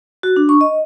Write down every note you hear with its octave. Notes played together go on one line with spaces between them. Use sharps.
F#4
D4
C#6
D#5